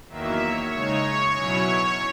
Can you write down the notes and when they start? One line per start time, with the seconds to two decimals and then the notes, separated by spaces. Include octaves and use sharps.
0.09 E2 D#3 F#3 A#3 E5
0.41 C#5
0.72 C#3 G#3 D#4 C#5
1.36 B2 F#3 C#4 E4 C#5